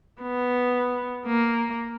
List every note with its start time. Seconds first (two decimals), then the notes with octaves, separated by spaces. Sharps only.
0.22 B3
1.26 A#3